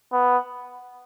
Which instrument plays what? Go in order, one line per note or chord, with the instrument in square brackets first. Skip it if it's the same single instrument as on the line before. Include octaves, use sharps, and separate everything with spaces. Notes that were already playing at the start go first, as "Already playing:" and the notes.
[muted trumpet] B3